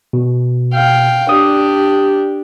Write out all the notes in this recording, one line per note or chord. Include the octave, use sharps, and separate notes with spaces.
B2
F5 G5
D4 G4 D#6